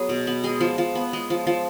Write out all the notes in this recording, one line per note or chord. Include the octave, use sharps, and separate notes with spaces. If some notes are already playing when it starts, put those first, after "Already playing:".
Already playing: F#3 B3 G#4
B2
B3
G#3 G#4
F3
F3
B3
G#3
F3
F3